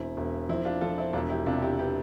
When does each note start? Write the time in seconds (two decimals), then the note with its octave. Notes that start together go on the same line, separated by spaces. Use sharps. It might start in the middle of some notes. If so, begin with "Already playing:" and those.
Already playing: E1 C4 E4
0.17 E1
0.49 F3 C4 E4
0.65 D4 F4
0.81 F3 F4 A4
0.98 C4 E4
1.13 E1 D4 F4
1.29 E4 G4
1.46 C3 D4 F4
1.62 E4 G4
1.79 G4 B4